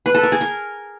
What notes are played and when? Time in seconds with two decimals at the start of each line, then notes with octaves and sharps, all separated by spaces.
0.06 B4
0.14 A4
0.23 A#4
0.32 G#4
0.41 A#4